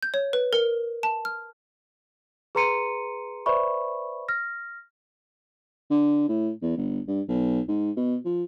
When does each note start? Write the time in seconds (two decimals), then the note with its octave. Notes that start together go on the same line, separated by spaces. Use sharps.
0.03 G6
0.14 C#5
0.33 B4
0.53 A#4
1.03 A5
1.25 F6
2.55 G#4 B4 A#5 C6 C#7 D#7
3.46 B4 C5 D5 E5 B5 C#6
4.28 F6 A#6
5.90 D3
6.28 A2
6.62 E2
6.77 G1
7.08 G2
7.28 B1
7.68 G#2
7.96 B2
8.25 F3